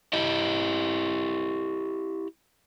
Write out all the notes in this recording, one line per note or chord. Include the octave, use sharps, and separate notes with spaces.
E4 G4 D#5